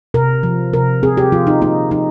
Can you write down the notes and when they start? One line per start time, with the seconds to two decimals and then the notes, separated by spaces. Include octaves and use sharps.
0.14 C3 A#4
0.43 F3
0.73 C3 A#4
1.03 C4 G#4
1.17 G4
1.32 F3 F4
1.47 D#4
1.62 A#3 D#4
1.91 F3 D#4